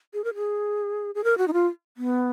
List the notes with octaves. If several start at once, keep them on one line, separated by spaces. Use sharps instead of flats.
G#4
A#4
G#4
G#4
A#4
F#4
D#4
F4
B3